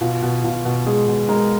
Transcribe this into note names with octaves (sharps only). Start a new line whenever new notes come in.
B2 F4
B2
B2 F4
B2
G#3 G#4
B2
G#3 A#4